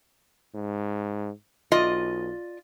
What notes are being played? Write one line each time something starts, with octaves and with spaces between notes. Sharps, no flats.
G#2
B1 F4 D5 D#5